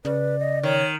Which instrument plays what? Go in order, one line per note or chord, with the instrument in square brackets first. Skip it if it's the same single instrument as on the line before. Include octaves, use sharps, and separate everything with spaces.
[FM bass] C#3 [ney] B4 [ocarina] D5
[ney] D#5
[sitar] D#3 [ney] C#5